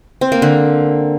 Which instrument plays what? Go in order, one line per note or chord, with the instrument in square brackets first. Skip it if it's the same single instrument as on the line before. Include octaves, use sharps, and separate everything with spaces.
[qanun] C4
A#3
D3